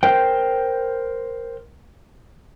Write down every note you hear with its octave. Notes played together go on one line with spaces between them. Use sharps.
A#4 C5 G5